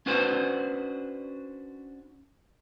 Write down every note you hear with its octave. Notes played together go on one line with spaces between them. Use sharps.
C#4 D4 F#4 B4 C5